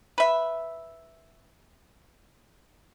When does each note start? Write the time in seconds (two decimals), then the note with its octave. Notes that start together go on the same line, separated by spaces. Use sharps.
0.18 B4 E5